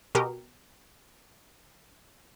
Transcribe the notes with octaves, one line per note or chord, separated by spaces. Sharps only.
B2 G4 A#4 D#5